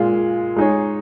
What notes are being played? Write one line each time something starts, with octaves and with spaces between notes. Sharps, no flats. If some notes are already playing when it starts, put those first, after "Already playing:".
Already playing: A#2 G#3 F4
G#3 D#4 G#4 C#5